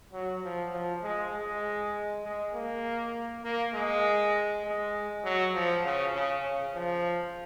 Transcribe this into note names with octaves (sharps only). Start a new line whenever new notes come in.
F#3
F3
F3
G#3
G#3
G#3
A#3
A#3
G#3
G#3
F#3
F3
C#3
C#3
C#3
F3